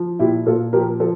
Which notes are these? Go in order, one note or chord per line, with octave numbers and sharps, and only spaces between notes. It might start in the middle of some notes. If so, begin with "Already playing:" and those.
Already playing: F3
A#2 E4 G4
A#2 F4 A4
F3 G4 A#4
F3 A4